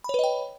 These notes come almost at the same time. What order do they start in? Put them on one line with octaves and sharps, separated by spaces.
B5 C#5 B4 D#5 G5